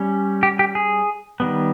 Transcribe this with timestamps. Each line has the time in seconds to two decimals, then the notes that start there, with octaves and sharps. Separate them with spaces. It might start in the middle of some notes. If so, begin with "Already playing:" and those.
Already playing: G3 C#4
0.43 G4
0.59 G4
0.75 G#4
1.40 D#3 G3 B3